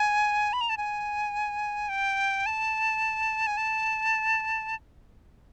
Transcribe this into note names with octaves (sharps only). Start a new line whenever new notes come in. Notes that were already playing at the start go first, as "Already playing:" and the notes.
Already playing: G#5
B5
A#5
A5
G#5
G5
A5
G#5
A5